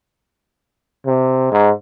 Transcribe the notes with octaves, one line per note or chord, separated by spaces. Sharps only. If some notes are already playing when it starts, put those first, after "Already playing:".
C3
G#2